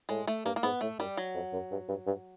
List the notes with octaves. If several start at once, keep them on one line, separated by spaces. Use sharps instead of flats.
A2 G#3
A3
G2 A#3
A#3
G#2 B3
A2 A3
F#2 G3
F#3
F2
F#2
G2
G2
G2